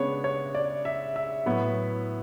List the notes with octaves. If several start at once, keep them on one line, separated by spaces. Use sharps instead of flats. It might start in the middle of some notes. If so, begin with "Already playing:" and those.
Already playing: C#3 G#3 B3 D4 C#5
C#5
D5
E5
E5
A2 F#3 B3 E4